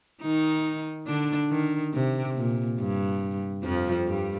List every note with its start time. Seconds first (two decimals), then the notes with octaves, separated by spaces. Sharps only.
0.22 D#3 D#4
1.07 D3 D4
1.50 D#3
1.94 C3
2.36 A#2
2.79 G2
3.63 F2 F3
4.07 G2 G3